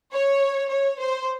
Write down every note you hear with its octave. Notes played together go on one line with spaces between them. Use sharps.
C#5
C#5
C5